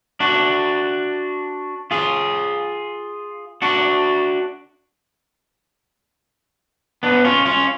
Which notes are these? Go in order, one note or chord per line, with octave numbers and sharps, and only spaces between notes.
D4 F#4
F4 G#4
D4 F#4
B3 D4
C#4 F4
C#4 F4